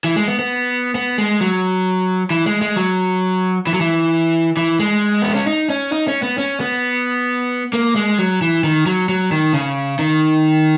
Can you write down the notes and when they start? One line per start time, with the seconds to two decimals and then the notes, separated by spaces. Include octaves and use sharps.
0.04 E3
0.16 G#3
0.27 B3
0.39 B3
0.95 B3
1.18 G#3
1.41 F#3
2.31 E3
2.46 G#3
2.62 G#3
2.76 F#3
3.67 E3
3.73 F#3
3.81 E3
4.57 E3
4.79 G#3
5.22 B3
5.35 C#4
5.47 D#4
5.70 C#4
5.92 D#4
6.08 C#4
6.23 B3
6.38 C#4
6.60 B3
7.73 A#3
7.96 G#3
8.18 F#3
8.42 E3
8.64 D#3
8.86 F#3
9.09 F#3
9.32 D#3
9.53 C#3
9.99 D#3